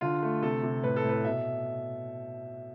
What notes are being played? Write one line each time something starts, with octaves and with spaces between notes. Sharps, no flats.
D3 F4
A3
C3 A4
C3
A2 B4
A4
A2 B4
B2 E5